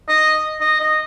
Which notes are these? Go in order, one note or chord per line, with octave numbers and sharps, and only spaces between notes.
D#5
D#5
D#5